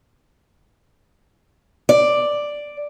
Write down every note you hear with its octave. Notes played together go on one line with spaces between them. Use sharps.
D5